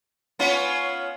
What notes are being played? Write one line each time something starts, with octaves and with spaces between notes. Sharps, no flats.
B3 C#4 F4